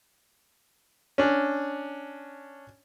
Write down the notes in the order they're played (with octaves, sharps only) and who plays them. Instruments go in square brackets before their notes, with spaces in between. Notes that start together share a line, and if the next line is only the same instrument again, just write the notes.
[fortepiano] C#4 D4